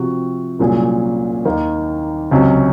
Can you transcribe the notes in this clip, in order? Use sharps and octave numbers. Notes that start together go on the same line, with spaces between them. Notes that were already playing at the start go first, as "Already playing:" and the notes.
Already playing: C3 F3 C4 F#4
C2 A#2 F#3 C#4 G#4
D#2 D#3 A#3
C#2 C3 F#3 C#4